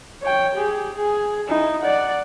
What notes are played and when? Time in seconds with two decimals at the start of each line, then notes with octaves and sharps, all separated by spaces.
0.22 C#5 G5
0.55 G4 G#4
0.96 G#4
1.48 D#4 E4
1.81 D5 F#5